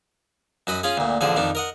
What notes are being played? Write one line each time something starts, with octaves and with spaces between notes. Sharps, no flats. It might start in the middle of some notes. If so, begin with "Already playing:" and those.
F#2 F#4 D#5 B5
C#4 F4 G#4
D2 A#2
A1 D3 F3 G#4
F2 D#3 D4
A#4 D#5 F#5